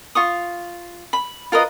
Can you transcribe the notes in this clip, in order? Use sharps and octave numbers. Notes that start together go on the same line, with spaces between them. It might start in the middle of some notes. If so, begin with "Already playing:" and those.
F4 C#6 D#6
B5
F4 A#4 B4 D#5